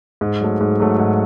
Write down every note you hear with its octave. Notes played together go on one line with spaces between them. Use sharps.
G#2
F#3 A3
G#2
F#3 A3
G#2